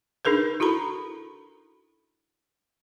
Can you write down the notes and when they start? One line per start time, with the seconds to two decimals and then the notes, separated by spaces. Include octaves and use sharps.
0.25 D4 D#4 G#4 A#4 B4
0.60 E4 F#4 A4 A#5 B5